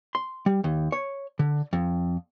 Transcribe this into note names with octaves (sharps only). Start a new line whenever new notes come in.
C6
G3
D#2
C#5
D3
F2